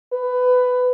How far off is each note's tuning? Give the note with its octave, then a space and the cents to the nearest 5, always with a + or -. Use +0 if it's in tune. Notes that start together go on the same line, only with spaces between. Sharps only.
B4 +15